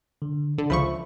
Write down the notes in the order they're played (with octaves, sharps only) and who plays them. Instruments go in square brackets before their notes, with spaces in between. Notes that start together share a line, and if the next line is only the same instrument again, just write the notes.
[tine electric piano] D3
[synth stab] D3
[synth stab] C#2 F3 C#6 [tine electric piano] E5 B5